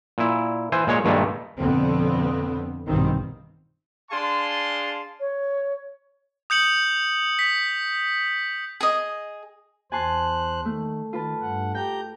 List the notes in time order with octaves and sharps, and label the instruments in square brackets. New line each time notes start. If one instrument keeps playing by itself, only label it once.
[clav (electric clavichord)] A#2 E4
E3 C5 G#5
A#2 G#3 C#5
G2 A#2 D#3 G#3 A3
[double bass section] F2 B2 D3 B3 C4
A#1 G2 B2 D#3 C4
[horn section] D4 G#4 F5 A5 C6
[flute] C#5
[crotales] D#6 G6 C#7 F#7
B6
[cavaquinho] G#4 D#5
[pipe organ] E2 C5 F#6 [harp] G#5 A5 C6
[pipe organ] D#3 [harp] A3
[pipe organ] D#3 [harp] F4 B4 A5
[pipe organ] G2 F#5
[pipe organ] G4 A#5 G6 [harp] G5